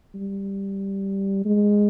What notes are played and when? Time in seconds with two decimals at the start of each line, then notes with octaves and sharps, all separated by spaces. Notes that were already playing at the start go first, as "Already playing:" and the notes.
0.14 G3
1.45 G#3